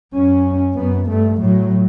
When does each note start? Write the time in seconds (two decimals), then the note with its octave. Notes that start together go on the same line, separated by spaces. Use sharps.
0.14 F#2 C#4
0.76 F#2 B3
1.08 G2 A3
1.40 A2 F#3